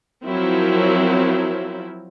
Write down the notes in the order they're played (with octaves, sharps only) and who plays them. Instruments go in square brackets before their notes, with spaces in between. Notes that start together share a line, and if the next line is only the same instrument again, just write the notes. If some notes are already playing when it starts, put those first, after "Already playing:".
[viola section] F3 F#3 C4 E4 A#4